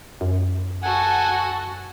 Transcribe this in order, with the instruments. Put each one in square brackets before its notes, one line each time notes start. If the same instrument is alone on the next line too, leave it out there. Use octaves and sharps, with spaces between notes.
[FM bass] F#2
[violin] F#4 A4 [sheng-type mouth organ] F#5 G#5